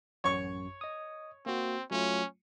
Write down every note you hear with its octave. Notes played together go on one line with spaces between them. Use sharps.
A1 F#2 C#5 C#6
D#5 D#6
A#3 C4 F#4
F#3 A3 C#4 F4